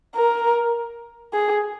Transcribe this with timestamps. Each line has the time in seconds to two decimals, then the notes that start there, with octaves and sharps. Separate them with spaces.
0.15 A#4
1.33 G#4